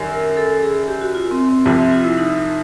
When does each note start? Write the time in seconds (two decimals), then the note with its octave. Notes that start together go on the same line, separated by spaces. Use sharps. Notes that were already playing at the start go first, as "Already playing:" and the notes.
Already playing: F#2 D#3 G3
0.12 A#4
0.37 A4
0.63 G#4
0.88 G4
1.02 F#4
1.15 F4
1.31 C4
1.49 C4
1.66 C2 C3 F3
1.79 C4
1.92 F4
2.04 E4
2.18 D#4